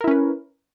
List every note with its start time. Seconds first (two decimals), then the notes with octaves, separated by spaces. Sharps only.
0.01 A#4
0.04 E4
0.08 C#4
0.11 B4